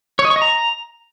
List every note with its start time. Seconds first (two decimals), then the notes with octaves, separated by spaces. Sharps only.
0.19 C#5
0.25 D#5
0.30 C#6
0.36 D#5
0.42 A#5